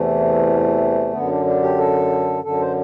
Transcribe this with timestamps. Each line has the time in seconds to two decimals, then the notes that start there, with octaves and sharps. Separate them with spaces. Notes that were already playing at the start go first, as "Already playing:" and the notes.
Already playing: E2 C3 E3 A3
1.12 F#2 D3 B3
1.28 D4
1.45 D4
1.62 G4
1.78 A4
2.44 F#2 D3 A4
2.61 C5